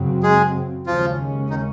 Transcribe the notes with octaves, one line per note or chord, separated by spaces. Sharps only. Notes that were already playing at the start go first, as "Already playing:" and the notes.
Already playing: F#2 C#3 F#3 C4
G#3 G#4
D#2 C#3 F3 G#3 C#4 F4
D#3 D#4